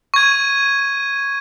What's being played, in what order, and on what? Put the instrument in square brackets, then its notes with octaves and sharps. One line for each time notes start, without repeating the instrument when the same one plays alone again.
[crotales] C#6 G#6 D#7